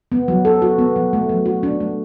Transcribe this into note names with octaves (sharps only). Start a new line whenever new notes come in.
B3
F#3
A4
F#4
B3
F#3
A3
F#3
F#4
D4
A3